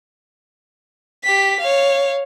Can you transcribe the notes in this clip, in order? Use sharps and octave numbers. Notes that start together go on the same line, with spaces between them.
G4 B6
C#5 F5